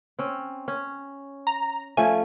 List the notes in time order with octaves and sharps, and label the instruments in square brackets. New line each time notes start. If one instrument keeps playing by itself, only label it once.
[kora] C4 C#4
C#4
[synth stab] A#5
[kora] F3 A3 C#4 [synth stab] G#5